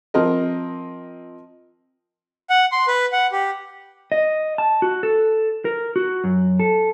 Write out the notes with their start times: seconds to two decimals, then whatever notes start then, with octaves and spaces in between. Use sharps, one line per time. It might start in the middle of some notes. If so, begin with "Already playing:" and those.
0.14 F3 C4 A#4 D#5
2.50 F#5
2.72 C6
2.88 B4
3.12 F#5
3.32 G4
4.12 D#5
4.58 A5
4.82 F#4
5.03 A4
5.65 A#4
5.96 F#4
6.24 F#2
6.60 A4